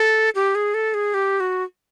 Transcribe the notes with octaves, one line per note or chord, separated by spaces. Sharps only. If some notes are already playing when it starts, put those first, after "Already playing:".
Already playing: A4
G4
G#4
A4
G#4
G4
F#4